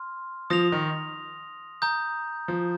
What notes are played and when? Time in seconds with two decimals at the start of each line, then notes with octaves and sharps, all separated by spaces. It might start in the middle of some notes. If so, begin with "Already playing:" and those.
Already playing: C6 F6
0.50 F3 D#6 A#6 F7
0.72 D#3
1.82 A#5 D#6 G6
2.48 F3